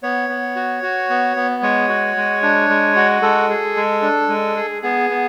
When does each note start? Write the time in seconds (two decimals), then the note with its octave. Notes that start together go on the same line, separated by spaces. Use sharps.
0.03 B3 C#5
0.29 B3
0.56 F#4
0.83 F#4
1.10 B3
1.36 B3
1.62 G#3 C#5
1.89 F#4
2.16 G#3
2.43 D4
2.70 G#3
2.96 F#4
3.22 G#3 A4
3.50 G#4
3.77 G#3
4.02 D4
4.29 G#3
4.57 G#4
4.82 B3 G#4
5.10 B3